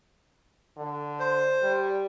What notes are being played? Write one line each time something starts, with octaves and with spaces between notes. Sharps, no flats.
D3
C5
G3